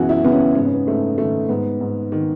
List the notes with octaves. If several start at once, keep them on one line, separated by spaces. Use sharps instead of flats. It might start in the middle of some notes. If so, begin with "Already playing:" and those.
Already playing: F#2 B2 E3 F#4 G#4
E4
C#3 B3
C#4
G#2 B3
C#4
B3
G#2 A3
D#3 A3
G#2 B3
G#2
D#3